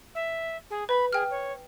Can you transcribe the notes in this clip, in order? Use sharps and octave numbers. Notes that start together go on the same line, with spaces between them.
E5
G#4
B4 B5
G#4 G5 F6
C#5